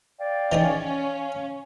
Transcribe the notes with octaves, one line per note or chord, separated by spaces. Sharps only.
D5 F5 G5
E3 C#4 D#4 G#4
F5